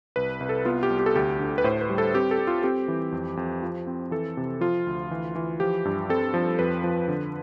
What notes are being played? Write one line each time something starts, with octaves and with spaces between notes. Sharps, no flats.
C2 B4
C2
A4
B3 F4
G4
C2
G4
A4
D2 G4
D3
B4
A2 C5
B4
G3
A4
C4 G4
A4
C4
F4
C4 G4
E3
F2
F2
F3
C4
E3 A4
C3
F3 F4
D2
E3
E3
F3 G4
G2
C4 A4
F3
F2 B4
F3
D3